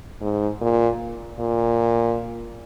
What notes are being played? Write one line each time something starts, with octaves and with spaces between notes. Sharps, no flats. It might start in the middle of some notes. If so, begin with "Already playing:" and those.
G#2
A#2
A#2